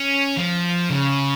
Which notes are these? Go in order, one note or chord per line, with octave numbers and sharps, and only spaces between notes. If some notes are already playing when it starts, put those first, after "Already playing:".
Already playing: C#4
F3
C#3